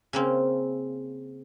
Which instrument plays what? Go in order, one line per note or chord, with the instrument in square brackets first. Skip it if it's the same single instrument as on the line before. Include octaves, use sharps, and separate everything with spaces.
[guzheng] C#3 A#3 C4